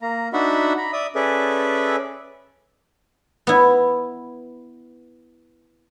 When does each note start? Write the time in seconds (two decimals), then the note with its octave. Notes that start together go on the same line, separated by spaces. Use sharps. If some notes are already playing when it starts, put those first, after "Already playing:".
0.02 A#3 A#5
0.33 D4 D#4 F#4 E5 F#5 B5
0.77 A#5 B5
0.93 D5 E5 D#6
1.15 C#4 G#4 A4 B4 D5 E5
3.47 B3 E4